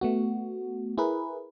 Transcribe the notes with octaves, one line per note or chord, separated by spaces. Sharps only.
A3 B3 F#4
E4 G#4 A#4 B4